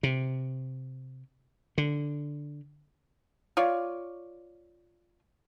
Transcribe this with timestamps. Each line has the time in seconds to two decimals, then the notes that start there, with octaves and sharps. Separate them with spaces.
0.03 C3
1.78 D3
3.57 F4 C#5 D5